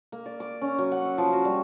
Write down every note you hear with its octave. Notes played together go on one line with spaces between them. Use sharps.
A#3
D5
D6
C#4
F#3
F#5
E5
F3
F#4
G3